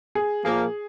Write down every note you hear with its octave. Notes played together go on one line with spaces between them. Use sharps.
G#4
A#2 F3 A#3 G#4